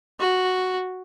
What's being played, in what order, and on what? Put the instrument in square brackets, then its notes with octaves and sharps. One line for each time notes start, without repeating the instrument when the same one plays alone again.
[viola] F#4